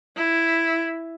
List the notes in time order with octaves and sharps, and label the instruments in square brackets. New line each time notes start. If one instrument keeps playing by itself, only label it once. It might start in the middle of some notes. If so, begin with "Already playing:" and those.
[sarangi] E4